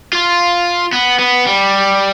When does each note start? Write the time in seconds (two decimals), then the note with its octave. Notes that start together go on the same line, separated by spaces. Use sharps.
0.13 F4
0.93 B3
1.19 B3
1.47 G3